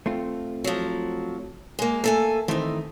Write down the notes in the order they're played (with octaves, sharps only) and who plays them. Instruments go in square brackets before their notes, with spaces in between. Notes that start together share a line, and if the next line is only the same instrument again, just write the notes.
[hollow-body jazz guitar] A3 C4 F4
[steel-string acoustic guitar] F3 F#3
G#3 A#3
[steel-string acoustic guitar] A3 A4 G#5 [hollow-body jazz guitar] A#3
[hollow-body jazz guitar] D#3 E3 A3 [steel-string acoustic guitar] C4 D#4